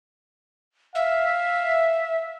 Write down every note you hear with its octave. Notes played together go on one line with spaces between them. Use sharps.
E5 F5